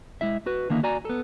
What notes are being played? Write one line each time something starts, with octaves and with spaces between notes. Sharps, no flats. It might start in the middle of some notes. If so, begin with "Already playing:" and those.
G#3 E4 E5
F#4 B4
D3 D#3 A#3 D#4 E4
F#4 D5 G#5 A#5
B3 A4